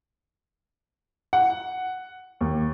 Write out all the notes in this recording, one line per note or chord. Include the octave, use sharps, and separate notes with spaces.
F#5
D#2